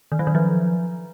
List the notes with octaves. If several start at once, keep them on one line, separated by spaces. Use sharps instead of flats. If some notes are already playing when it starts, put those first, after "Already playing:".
D#3
F#3
D#3
F3